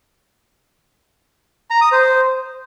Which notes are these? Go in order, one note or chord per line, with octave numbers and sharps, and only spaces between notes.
A#5
D#6
C5